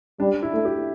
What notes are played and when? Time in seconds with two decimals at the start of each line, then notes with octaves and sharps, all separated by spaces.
0.20 G3 D4
0.42 E4
0.54 A3
0.65 G4